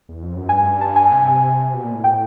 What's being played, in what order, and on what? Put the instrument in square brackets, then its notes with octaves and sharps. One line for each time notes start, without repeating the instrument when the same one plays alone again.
[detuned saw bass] E2
F2
F#2
[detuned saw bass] G2 [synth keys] G#5
[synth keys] A5
G#5
[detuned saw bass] C3 [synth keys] G#5
[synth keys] G#5
[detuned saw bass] B2
A#2
A2
[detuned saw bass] A2 [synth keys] G5